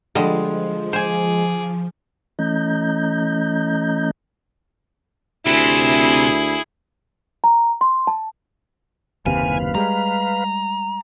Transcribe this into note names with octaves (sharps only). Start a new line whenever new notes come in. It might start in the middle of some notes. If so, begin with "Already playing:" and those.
D3 F3 G3 G#3 D#5
G#4 C5 G#5 D6
E3 A3 C#4 D#5 A#5 G6
D2 C3 E4 G#4
A#5
C6
A5
F#1 D#2 C3 B4 F5 G#5
G3 G#3 A#5